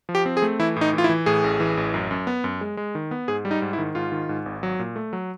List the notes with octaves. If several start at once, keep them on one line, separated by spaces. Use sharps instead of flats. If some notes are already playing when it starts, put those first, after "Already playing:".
F3
G4
C4
G#4
A3
E3 E4
A2 D#4
E3
F4
E4
E3
A2 G#4
A1
E3
A1
F#2
F#2
B3
F#2
G#3
G#3
D#3
B3
G#2 G#4
G3
D#4
G#2
E4
D#3
G#2 F4
D#3
G#2
G#1
F#3
A#2
A3
F#3